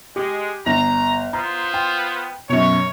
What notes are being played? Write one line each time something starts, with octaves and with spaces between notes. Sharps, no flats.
G#3 G4
G1 A#5
B3 F4 C5 A#5
G5
F#2 B2 A#4 C#5